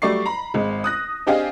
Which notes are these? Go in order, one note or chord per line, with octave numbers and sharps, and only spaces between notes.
F#3 G3 A3 D5 C#6 C7
A#5 B5
G#1 G#3
D#6 F#6 A#6
C4 D4 G4 G#4 D#5 F5